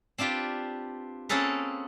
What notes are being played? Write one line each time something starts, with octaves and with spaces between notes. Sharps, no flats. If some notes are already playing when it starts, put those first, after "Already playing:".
C4 D4 F4 G4 B4
A#3 C4 C#4 G#4 A4 B4